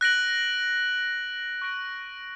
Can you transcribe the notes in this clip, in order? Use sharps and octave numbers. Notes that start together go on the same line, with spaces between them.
F#6 A#6 D7 F#7
C#6 F#6 A#6 D7